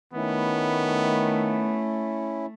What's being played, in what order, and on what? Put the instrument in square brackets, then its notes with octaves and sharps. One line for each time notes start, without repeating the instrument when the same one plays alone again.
[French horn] D#3 [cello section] A3 [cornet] B3 [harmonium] C#4 E4